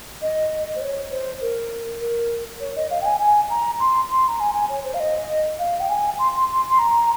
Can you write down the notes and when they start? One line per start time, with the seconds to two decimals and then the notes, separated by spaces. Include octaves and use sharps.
0.22 D#5
0.76 C5
0.81 C#5
1.11 C5
1.41 A#4
2.01 A#4
2.60 C#5
2.76 D#5
2.90 F5
3.01 G5
3.05 G#5
3.20 G#5
3.50 A#5
3.80 C6
4.10 C6
4.28 A#5
4.40 G#5
4.55 G#5
4.69 C#5
4.84 C5
4.94 F5
5.00 D#5
5.59 F5
5.80 G5
5.89 G#5
6.19 C6
6.36 C6
6.52 C6
6.70 C6
6.79 A#5